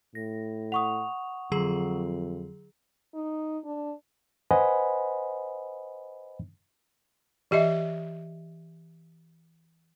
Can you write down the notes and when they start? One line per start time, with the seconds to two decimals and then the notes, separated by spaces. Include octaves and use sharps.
0.15 A2 A#6
0.72 F#5 C#6 D#6 F7
1.52 F2 D3 F#3 G#4
3.14 D#4
3.64 D4
4.51 B4 C5 D#5 F#5 G#5 B5
7.51 E3 G4 D#5 E5